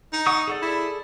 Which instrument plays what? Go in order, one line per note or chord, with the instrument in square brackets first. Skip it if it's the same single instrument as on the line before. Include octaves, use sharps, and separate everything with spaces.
[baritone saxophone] D#4
[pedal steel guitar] F#5 C#6 D#6
G#4 A4 D5
[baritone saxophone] E4